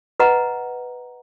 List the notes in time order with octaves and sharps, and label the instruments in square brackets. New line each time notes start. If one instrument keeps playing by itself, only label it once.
[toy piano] B4 D#5 F#5 A#5